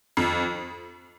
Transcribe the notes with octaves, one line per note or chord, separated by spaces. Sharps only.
F2